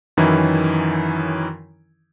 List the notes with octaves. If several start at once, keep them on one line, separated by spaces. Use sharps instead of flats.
F#2 D#3 E3 C#4 E4